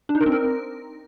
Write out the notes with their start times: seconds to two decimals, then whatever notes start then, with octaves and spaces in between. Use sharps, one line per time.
0.09 D4
0.15 D#4
0.21 A#4
0.26 C4
0.32 A#4